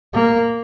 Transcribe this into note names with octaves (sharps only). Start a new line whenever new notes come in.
A#3